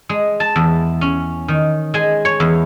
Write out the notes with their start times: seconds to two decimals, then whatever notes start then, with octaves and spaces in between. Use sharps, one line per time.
0.09 G#3
0.40 A5
0.56 E2
1.01 C#4
1.48 D#3
1.94 G#3 G#5
2.25 C#5
2.40 E2